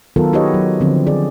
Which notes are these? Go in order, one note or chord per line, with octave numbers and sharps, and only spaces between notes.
D#3 F#3 B3 F4 A4 A#4
D#4 F#4 G4 B4 C#5 D#5
F#3
D3 F3 C4
G#4 D5